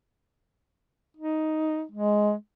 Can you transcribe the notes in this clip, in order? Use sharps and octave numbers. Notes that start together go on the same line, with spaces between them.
D#4
G#3